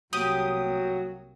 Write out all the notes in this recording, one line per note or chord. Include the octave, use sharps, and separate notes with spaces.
C2 F#3 A#3 G4 D#6